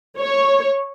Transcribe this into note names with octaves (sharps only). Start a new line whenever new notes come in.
C#5